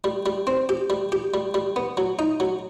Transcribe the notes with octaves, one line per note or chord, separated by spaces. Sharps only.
G3
G3
C4
G4
G3
G4
G3
G3
B3
F#3
D#4
F#3